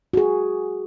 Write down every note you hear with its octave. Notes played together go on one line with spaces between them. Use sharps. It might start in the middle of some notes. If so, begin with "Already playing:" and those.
F#4 G#4